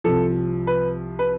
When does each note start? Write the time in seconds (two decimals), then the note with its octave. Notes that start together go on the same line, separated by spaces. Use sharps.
0.04 C2 C3 F3 A4
0.67 B4
1.19 B4